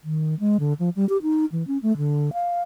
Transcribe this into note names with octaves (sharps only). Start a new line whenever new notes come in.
D#3
G#3
D3
F3
G3
G4
D#4
E3
C#4
A3
D3
F5